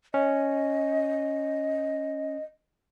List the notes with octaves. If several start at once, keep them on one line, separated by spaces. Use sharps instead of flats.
C#4 D#5